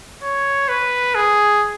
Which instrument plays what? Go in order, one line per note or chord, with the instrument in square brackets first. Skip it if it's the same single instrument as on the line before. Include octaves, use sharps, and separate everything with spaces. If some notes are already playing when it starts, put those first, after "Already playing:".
[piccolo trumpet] C#5
B4
G#4